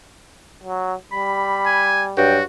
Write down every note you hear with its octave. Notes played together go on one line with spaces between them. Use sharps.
F#3
G3 B5
G#5
G2 F#3 F#4 G5